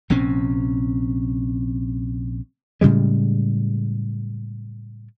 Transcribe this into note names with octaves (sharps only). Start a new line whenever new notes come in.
A#1 C3 C4 C#4
A2 C#3 G3 G#3